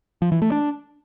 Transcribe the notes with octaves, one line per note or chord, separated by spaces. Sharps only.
F3
E3
A3
D4